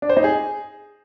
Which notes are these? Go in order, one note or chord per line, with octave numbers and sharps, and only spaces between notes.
D4
C5
D#4
G#4